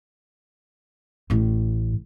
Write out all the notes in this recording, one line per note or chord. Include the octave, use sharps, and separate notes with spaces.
A1 A2